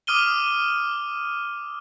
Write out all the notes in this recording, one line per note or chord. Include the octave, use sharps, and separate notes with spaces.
D6 D#6 F6 D#7 G7